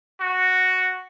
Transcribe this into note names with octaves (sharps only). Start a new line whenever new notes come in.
F#4